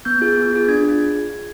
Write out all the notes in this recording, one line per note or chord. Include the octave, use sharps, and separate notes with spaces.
B3 G6
F4 G#4
B3
F4 G#4
D4 G#6
F4 G#4